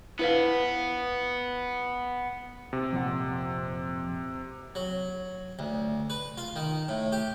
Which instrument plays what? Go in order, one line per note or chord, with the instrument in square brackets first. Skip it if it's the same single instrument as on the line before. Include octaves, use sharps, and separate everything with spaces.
[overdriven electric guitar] B3 [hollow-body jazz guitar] E4 B4 F5
[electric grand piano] C3
[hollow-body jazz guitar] F2 A#2 F#5
[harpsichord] F#3
D2
B4
F4
D#3
A2
G4